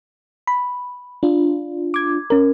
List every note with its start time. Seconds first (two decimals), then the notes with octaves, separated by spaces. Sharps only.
0.47 B5
1.23 D4 F4
1.94 D6 G#6
2.30 C#4 A#4